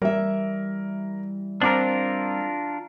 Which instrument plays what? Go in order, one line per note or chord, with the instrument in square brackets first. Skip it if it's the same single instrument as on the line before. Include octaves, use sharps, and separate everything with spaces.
[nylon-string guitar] E3 E5 [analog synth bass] G3 [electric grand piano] A#4
[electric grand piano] C4 D6 [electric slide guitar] D4 F4 A#4